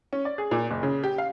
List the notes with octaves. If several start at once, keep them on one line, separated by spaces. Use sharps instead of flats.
C#4
D5
G#4
A#2
F#1
C#3
G4
F5